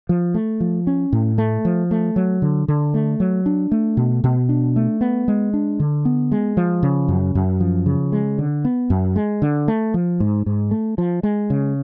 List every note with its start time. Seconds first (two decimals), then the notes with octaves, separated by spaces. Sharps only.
0.09 F3
0.34 A3
0.60 F3
0.87 C#4
1.13 A2
1.38 A3
1.65 F3
1.91 A3
2.16 F#3
2.42 D3
2.68 D3
2.94 A3
3.20 F#3
3.46 D4
3.72 A3
3.97 B2
4.24 B2
4.49 D4
4.76 A3
5.01 B3
5.28 G#3
5.54 D4
5.80 D3
6.05 B3
6.32 G#3
6.57 F3
6.83 C#3
7.08 F#2
7.35 F#2
7.60 F3
7.86 C#3
8.12 G#3
8.39 D3
8.65 B3
8.90 F#2
9.16 G#3
9.42 D3
9.68 A3
9.94 F3
10.20 G#2
10.46 G#2
10.71 A3
10.98 F3
11.23 G#3
11.50 C#3